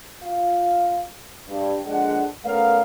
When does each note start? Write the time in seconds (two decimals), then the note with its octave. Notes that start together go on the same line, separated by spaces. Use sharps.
0.23 F4 F5
1.49 G2
1.86 A#1 D3 G#3 D4 F#5
2.45 A3 B3 C#4 A#4 F5